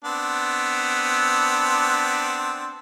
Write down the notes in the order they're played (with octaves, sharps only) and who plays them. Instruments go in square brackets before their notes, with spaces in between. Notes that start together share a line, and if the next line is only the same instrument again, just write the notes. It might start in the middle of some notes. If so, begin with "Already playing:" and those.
[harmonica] B3 C4 D4